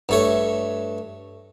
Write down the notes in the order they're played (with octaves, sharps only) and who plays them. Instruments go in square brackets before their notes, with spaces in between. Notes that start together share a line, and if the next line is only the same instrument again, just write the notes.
[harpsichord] G2 A3 C#5